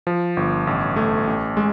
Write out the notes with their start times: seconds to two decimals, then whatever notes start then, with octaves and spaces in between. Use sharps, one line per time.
0.07 F3
0.37 G1
0.67 A1
0.96 A3
1.27 A1
1.57 G#3